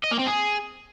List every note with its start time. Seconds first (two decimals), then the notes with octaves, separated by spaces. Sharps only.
0.04 D#5
0.11 A#3
0.19 C4
0.27 G#4